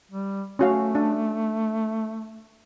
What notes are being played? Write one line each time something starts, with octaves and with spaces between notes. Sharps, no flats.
G3
A3 C#4 F#4 F5
D4